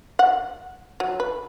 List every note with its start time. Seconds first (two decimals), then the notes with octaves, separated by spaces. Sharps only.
0.19 F#5
1.00 F#3
1.20 B4